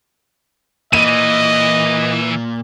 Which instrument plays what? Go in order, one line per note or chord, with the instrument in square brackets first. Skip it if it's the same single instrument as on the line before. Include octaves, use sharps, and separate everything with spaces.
[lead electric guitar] A#2 A#3 [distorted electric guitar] E3 [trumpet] D#5 [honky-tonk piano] D#7